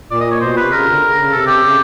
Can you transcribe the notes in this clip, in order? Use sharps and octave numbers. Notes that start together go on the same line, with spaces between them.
A#2 D5
D#5
C#5
B2 C5
C3 B4
C#3 A#4
D3
C#3
C#3
C3 A4
G4
C#3